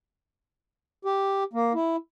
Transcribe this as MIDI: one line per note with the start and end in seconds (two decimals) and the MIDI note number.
1.05 1.44 67
1.53 1.73 58
1.74 1.96 64